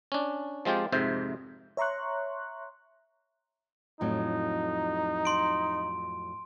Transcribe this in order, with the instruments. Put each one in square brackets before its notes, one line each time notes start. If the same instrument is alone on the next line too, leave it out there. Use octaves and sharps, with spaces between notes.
[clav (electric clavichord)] C#4 D4
F3 G#3 C4 F4 G4
F2 G#2 C3 C5 E5
[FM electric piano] C#5 E5 A#5 C6 C#6 F#6
[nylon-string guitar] F2 A2 F#3 [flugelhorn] D#4
[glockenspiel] C6 D7